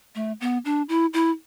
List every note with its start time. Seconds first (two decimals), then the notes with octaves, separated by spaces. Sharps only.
0.15 A3
0.41 B3
0.65 D4
0.89 E4
1.14 E4